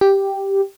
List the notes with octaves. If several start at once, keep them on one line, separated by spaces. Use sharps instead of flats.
G4